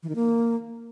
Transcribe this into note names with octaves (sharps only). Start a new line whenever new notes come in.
E3
D#3
A#3